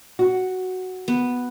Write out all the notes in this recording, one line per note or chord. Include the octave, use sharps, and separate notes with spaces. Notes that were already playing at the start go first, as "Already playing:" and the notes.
F#4
B3